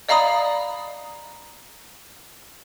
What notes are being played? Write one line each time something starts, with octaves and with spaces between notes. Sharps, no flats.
D5 D#5 F5 A#5 B5 D#6